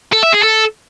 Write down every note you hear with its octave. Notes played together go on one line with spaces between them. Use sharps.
A4
E5
G#4
A4